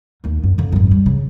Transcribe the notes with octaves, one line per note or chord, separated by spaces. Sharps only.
D#2 D#4
F#2
F2 D3
G#1 F#2
G3
C#3